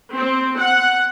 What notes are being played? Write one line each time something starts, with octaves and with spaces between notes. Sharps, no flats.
C4
F#5